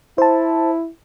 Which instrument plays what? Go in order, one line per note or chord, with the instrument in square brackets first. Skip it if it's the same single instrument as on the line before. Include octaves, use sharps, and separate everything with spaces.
[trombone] E4 [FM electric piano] C5 A5